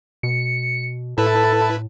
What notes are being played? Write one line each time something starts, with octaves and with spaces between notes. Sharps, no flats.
B2 C#7
A2 E4 A4 B4 A5